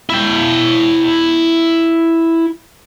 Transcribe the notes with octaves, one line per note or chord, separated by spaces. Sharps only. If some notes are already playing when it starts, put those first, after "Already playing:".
E4 G5